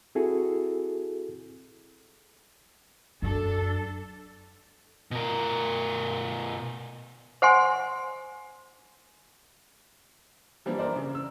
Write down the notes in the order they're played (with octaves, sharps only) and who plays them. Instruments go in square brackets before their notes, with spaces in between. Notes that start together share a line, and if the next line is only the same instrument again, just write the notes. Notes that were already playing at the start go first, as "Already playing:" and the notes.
[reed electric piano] C4 E4 F#4 G#4 A4
[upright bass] F#2 [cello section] D4 A4
[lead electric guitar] B2 A#4
[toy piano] C5 F#5 G#5 C6
[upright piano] E3 F3 G3 A#3 C4 D4
E3 A#4 C5 D5
C#3
E6